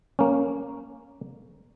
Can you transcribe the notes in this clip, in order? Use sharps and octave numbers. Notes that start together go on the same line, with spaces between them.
A#3 C#4